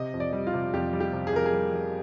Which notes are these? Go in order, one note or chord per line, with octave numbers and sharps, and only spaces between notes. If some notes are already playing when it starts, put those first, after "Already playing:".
Already playing: C3 D#5
F2
D5
G3
F4
C3
F2 G4
G3
G4
C3
G#4
F2 A#4
G#4
G3
G3